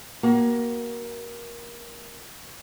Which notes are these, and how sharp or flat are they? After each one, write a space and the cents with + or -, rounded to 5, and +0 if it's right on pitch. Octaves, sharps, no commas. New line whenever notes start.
A#3 +20 F#4 +35